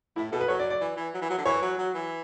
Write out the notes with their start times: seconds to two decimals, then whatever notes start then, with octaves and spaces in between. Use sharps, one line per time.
0.16 A2 E4
0.32 B2 A4
0.40 B4
0.48 F#3 C#5
0.59 D5
0.70 D5
0.81 E3
0.97 E3
1.14 F#3
1.22 E3
1.30 F#3
1.38 D3
1.46 E3 C#5
1.62 F#3
1.78 F#3
1.94 E3